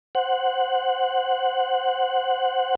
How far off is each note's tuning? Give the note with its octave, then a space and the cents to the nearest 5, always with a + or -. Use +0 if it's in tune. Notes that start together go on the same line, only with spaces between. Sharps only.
C5 +0 F#5 +0